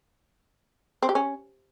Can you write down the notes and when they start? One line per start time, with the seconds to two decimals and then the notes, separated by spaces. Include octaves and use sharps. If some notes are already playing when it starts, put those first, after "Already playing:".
1.02 C4
1.09 G4
1.15 C#4